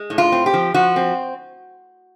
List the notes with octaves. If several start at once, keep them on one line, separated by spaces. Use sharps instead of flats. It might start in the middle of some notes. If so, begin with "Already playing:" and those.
Already playing: G#3
A2
F4
C4
G4
F3
F3 F#4
C4